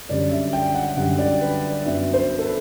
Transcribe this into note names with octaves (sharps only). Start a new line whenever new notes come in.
F#2 D3 G3 D5
E5
G5
F#5
F#2 D3 G3 F#5
D5
B4
F#2 F#3 B3 D4 E5
C5
A4
B4